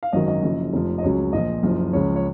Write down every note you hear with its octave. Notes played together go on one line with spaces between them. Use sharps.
F5
G#1 F#2 D#3 F#3 D#5
D#5
F#1 F#2 C#3 F3
F1 F2 F3
D#5
C#2 C#3 F#3 C#5
A#1 A#2 F3 D#5
F#1 F#2 F3
C#2 C#3 F3 C#5
C#5